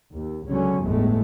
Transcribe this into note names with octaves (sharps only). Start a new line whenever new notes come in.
D#2
C#2 D3 F#3 C#4
G1 E2 A2 G#3 A3